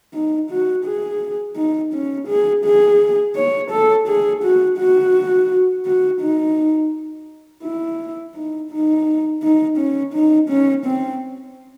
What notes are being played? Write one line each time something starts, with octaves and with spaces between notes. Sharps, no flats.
D#4
F#4
G#4
D#4
C#4
G#4
G#4
C#5
A4
G#4
F#4
F#4
F#4
D#4
E4
D#4
D#4
D#4
C#4
D#4
C#4
C4